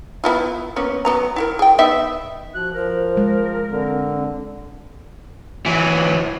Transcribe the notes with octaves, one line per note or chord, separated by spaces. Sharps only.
B3 E4 F4
A#3 B3 C#4
F#3 B3 A#5
E4 F#4 A#4
G#4 G5
B3 D#4 E5
F3 F#4 F#6
F3 A#4 C5
G#3
D3 C4
E3 F#3